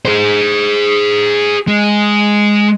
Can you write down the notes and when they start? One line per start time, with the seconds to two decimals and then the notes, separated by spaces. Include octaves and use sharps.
0.05 G#4 C5
1.67 G#3